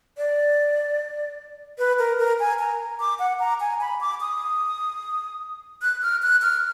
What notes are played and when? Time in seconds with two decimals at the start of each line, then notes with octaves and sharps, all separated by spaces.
0.18 D5
1.78 B4
1.99 A#4
2.19 A#4
2.39 G#5
2.59 A#5
3.00 D6
3.19 F#5
3.40 A#5
3.60 G#5
3.81 B5
4.01 D6
4.21 D#6
5.82 F#6
6.02 F6
6.22 F#6
6.42 F6